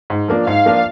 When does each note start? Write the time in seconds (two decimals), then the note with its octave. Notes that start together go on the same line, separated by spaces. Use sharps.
0.10 G#2
0.28 F3 A#3 D4
0.47 G#2 F5
0.65 F3 A#3 D4 F4